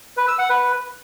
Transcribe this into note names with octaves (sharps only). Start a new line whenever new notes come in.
B4
E6
F#5
B4